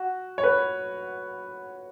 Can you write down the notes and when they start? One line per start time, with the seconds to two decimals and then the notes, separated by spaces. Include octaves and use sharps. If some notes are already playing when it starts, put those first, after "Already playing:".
Already playing: F#4
0.38 C#5
0.43 B4